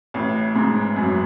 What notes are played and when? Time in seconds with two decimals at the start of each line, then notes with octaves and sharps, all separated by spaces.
0.14 A1 A2
0.56 G#2
0.96 F#2